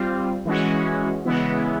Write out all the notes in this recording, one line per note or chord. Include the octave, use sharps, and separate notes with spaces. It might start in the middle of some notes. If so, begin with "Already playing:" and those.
Already playing: G3 C4 F4
E3 G#3 C#4 F#4
C#3 E3 G#3 B3 E4